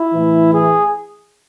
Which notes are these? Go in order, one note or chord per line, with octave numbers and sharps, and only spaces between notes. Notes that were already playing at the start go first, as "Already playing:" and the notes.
Already playing: E4
A2 E3
G#4